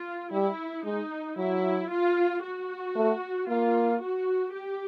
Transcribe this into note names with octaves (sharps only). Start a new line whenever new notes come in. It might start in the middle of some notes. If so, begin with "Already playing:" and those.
Already playing: F4
G3 E4
G#3 D#4
F#3 E4
F4
F#4
A3
A#3 F4
F#4
G4